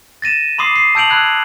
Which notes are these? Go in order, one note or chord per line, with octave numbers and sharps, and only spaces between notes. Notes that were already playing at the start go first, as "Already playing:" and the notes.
A6 A#6 D#7 E7
B5 C6 D6 D#6 C7
C7
A5 E6 G6 D7 F7 F#7
B5 E6 F#6 G#6